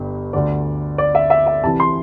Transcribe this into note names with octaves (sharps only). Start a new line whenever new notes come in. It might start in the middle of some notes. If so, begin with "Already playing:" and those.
Already playing: G1 G2
D2 D3 D5
D5
E5
E5
E5
C2 C3 E3 A5
C6